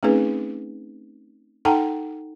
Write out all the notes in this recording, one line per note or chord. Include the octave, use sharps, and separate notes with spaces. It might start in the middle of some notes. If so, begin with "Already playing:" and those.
A3 C4 C#4 D#4 G#4 B4
D#4 A4 F#5 G5 A5 A#5